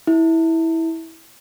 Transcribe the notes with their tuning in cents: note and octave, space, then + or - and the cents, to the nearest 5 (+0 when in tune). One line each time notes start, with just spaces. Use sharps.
E4 -15